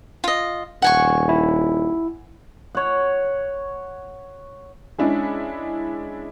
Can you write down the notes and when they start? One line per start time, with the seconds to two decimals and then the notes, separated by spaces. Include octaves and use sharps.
0.24 F4 D#5
0.82 D#1 F#5 G#5 C#6
1.29 E4
2.75 C#5 F#5
4.98 G#3 C#4 D4 E4 G#4